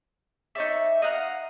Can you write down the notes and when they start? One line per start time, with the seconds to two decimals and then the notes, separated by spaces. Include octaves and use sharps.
0.55 D#4 C#5 D5 E5
1.02 D#5 F5 F#5 A#5